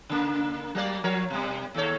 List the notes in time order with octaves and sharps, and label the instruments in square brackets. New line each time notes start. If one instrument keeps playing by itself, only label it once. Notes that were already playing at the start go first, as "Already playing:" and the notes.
[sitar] C#3 A#3
F#3 A#3 D5
F3 A#4 C#5
B2 G3
D#2 A4 C#5